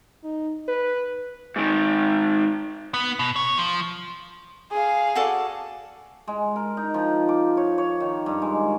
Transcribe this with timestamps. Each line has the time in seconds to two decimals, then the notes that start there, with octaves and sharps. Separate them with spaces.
0.24 D#4
0.68 B4
1.56 G#2 D#3
2.94 B3
3.19 B2
3.36 C#5
3.57 F3
4.71 G#4 F5
5.15 F#4 A4 D5
6.27 G#3
6.56 A#4
6.77 D#4
6.94 F3
7.29 D6
7.57 C#5
7.78 C#5
8.00 D#3
8.26 G2
8.42 G#3